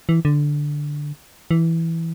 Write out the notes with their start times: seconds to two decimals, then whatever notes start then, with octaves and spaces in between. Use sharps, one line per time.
0.09 E3
0.25 D3
1.51 E3